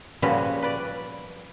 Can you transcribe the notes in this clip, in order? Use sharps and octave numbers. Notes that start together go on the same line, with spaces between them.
A#2 C#3 F3 G3 F#4 B4
B4 D5